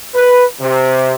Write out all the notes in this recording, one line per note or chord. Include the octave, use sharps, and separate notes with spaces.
B4
C3